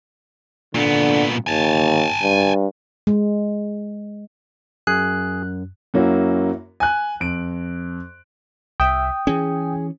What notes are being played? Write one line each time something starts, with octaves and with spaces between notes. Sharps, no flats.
A#2 D3 B3
D#2 G#5 A5
G2
G#3
F#2 G#4 F#6
F#2 A#3 C#4 E4 F#4
G#5 F#6
F2 D7
C2 E5 G5 D#6
E3 C#4 G#4